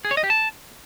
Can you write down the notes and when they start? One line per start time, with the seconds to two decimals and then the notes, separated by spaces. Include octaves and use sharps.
0.05 G#4
0.11 C#5
0.17 D#5
0.24 G4
0.30 A5